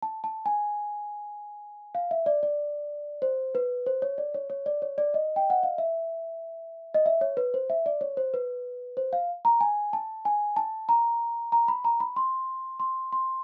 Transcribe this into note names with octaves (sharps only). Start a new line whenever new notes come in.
A5
A5
G#5
F5
E5
D5
D5
C5
B4
C5
C#5
D5
C#5
C#5
D5
C#5
D5
D#5
G5
F#5
F5
E5
D#5
E5
C#5
B4
C5
E5
D5
C#5
C5
B4
C5
F5
A#5
G#5
A5
G#5
A5
A#5
A#5
B5
A#5
B5
C6
C6
C6